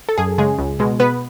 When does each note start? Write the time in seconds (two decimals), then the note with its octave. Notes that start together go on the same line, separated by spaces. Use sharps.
0.09 A4
0.18 F#2 G#4
0.38 C#3 G#3 G#4
0.59 C#2
0.79 B2 G#3
1.00 B2 B3 B4